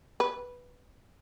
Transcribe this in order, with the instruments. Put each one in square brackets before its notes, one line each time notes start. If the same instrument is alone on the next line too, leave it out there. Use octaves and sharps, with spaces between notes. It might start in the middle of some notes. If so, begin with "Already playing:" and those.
[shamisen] B4